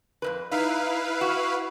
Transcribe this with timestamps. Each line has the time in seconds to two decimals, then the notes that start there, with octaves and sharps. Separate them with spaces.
0.22 F2 G#2 B4
0.51 D#4 E4 B4 F5
1.21 F#4